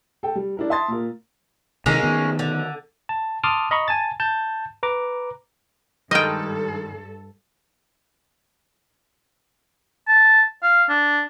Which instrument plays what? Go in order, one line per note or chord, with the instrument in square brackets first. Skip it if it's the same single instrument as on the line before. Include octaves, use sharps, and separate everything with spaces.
[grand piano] A4 G5
G3
D4 E4 A#4
E5 A5 C6 D#6 A6
A#2 A#4
[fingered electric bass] C3 D#3 [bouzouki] G#3 A#3 C#4
[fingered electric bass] D#3 B3
[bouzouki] D3
[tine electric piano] A5
A5 C6 D6 D#6 F6
D#5 A#5 B5 C#6
G#5 A5 A6
A5 G6
B4 A#5 D6
[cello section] G2 A4 [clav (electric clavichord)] D#3 G3 G#3 [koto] D#5 G5
[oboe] A5
F5
D4